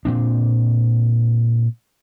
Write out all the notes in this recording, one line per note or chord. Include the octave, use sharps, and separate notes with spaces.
A#2 C4 D4